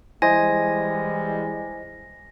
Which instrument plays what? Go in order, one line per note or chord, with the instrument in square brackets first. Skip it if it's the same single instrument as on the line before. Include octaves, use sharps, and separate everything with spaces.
[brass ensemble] E3 G3 G#3 [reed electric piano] E4 C5 D#5 [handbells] G#5 [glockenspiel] A#6